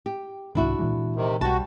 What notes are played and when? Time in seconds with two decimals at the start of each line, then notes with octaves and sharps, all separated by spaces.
0.06 G4
0.55 C2 G#2 D#3 D4 E4 F#4
0.79 A#2 E3 G#3
1.16 C3 D#3
1.41 B1 G3 F#4 A5